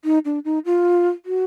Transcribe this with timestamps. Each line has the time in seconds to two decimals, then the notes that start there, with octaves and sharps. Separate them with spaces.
0.04 D#4
0.25 D4
0.45 D#4
0.65 F4
1.26 F#4